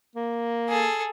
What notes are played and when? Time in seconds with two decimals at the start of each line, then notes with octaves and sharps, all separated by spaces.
0.16 A#3
0.69 G#4 A4